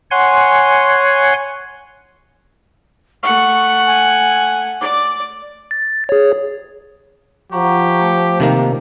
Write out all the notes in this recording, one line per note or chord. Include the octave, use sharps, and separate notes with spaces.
C#5 F#5 G#5 C6
A3 F#5 C#6
G#5
D5 D6
A6
G#4 C#5
F3 G4 F#5 A#5 C#6
A3
C3 D#3 A#3